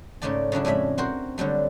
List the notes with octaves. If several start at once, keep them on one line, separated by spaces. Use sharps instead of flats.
G#2 C#3 G#3 A3 D5 A5
C#3 F#3 D4 E4
F2 A2 G#3 E5 B5
C4 F#4 A#4 C5
D3 F#3 G3 A3